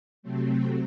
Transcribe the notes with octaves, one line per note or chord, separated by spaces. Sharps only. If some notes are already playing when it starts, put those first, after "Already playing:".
C3 F#3 A3 C4
G5